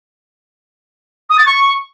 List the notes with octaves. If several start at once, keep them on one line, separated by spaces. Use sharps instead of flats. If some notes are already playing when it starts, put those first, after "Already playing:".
D#6
A6
C#6